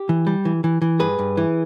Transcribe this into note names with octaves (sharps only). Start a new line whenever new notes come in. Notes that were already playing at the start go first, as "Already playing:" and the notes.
Already playing: G4
E3
G3
E3
E3
E3
G2 G#4 B4
G2
E3